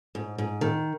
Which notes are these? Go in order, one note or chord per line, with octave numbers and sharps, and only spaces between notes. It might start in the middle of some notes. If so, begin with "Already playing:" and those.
G#2
G#2
D#3